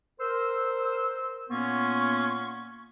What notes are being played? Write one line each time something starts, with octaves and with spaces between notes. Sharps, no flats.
A#4 C5 E6
A#2 A#3 B3 C#4 C6 C#6